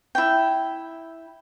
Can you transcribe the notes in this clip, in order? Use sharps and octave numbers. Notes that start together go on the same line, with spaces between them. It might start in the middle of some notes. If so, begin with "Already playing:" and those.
E4 G5